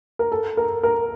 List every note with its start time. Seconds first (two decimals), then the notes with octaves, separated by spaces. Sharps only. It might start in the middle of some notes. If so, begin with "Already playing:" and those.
0.19 A#4
0.32 A4
0.57 A#4
0.83 A#4